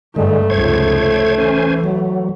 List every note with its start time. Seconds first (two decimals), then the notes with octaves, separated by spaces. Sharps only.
0.16 G2 D3 G#3 A3
0.50 F1 C#2 C5 C#5 G#6
1.38 E3 C#4 C5 G#5
1.84 F#3